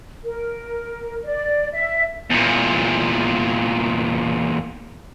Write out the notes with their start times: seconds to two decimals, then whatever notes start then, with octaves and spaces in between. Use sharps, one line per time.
0.24 A#4
1.24 D5
1.73 E5
2.30 E2 A#2